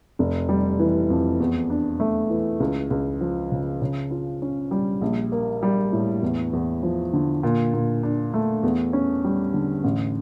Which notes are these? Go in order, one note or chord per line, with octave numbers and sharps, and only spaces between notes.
F1
G3
E3
F2
E2
D4
A3
E3
C#2
C#2
F3
C#3
C#3
F4
C#4
G3
A#1
A#3
G3
A2
E2
E2
F3
D3
A#2
A#2
D4
A3
E2
C#4
G3
D3
A1